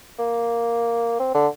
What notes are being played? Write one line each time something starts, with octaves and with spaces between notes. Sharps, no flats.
A#3
C4
D3